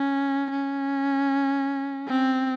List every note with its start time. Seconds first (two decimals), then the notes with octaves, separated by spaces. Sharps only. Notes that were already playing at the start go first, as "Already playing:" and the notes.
Already playing: C#4
0.51 C#4
2.08 C4